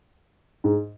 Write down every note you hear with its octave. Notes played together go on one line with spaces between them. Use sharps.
G#2